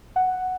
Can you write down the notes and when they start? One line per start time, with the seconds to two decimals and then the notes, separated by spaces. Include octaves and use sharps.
0.16 F#5